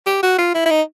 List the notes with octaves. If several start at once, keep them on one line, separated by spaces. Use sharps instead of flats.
G4
F#4
F4
E4
E4
D#4